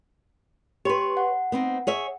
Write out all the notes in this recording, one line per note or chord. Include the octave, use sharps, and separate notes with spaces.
G4 B4 C#5 C6
F#5
B3 C4 D#4
G#4 C#5 E5